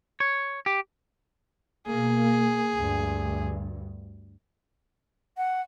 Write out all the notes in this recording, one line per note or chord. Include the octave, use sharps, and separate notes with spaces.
C#5
G4
B2 A#3 G#4
D2 G2
F#5